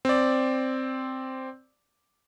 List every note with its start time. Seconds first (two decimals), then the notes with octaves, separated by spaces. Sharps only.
0.05 C4 D5